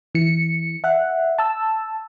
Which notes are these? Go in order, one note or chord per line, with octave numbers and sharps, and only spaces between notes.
E3 C#7
E5 F#5
A5 E6